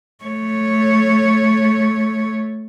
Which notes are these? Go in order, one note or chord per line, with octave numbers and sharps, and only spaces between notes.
A3 C#5